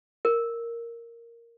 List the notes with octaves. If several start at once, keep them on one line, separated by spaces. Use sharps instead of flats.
A#4